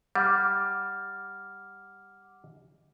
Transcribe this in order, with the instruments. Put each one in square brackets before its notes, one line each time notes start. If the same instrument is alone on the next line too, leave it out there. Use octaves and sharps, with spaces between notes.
[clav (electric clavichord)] G3 [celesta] F#5 D6 F6